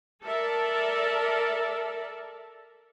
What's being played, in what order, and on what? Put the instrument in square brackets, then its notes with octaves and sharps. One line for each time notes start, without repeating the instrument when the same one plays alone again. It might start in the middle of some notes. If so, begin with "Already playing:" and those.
[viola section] A4 A#4 D5 E5 A5